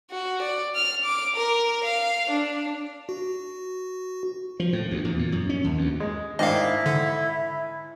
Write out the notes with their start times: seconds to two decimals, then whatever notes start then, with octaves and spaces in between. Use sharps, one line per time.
0.11 F#4
0.42 D5
0.76 F6
1.04 D6
1.36 A#4
1.85 F5
2.31 D4
3.09 F#4
4.60 F3
4.73 A2
4.91 D2
5.05 E2
5.19 A#2
5.32 F#2
5.49 C#4
5.64 D#2
5.77 D2
6.00 G#3
6.39 G#2 D#3 D4 E4 D#5 F5
6.86 D3